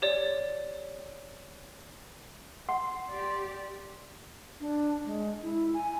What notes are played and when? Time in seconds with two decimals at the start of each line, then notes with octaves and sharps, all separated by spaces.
0.02 G4 C#5 D5
2.69 F#5 C6
3.11 G4 D5
4.60 D4
5.06 G#3
5.43 E4
5.74 G#5